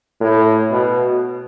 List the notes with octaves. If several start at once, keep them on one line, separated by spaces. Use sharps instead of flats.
A2
B2